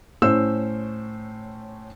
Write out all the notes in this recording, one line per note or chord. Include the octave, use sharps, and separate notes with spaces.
A2 C#4 C5 E6